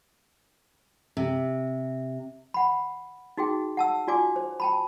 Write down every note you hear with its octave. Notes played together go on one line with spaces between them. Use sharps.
C3
F#5 B5
D#4 F#4 G#4 G5
F#5 A5 E6
F4 F#4 D5 G#5 D6
C5
G5 A5 B5